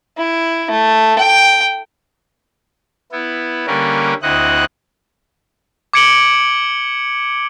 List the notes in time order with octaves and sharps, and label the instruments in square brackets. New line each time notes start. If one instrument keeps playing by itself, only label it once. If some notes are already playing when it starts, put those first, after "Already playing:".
[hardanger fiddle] E4
A3
G5
[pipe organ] B3 E4
D3 G3 A#3 C#4 A#4 B4
D2 C4 E4 D#5 F#5 F#6
[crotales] D6 G#6 C#7 D7 F#7 G7